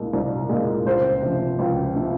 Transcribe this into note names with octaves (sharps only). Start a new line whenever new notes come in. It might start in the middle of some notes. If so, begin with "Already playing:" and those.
Already playing: C2 A#2 G#3
C2
A#2 G#3
C#2 C5
C3 F3
C#2
C3 F3